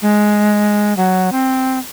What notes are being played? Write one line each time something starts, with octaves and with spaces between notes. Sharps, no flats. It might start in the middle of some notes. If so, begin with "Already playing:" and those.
G#3
F#3
C4